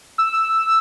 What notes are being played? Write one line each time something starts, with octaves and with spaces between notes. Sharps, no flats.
E6